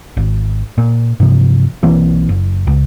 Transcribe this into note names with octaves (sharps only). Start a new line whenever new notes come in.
G#1
A#2
G2 C3 F3
B1 E3 A#3 C4
F#1
C#2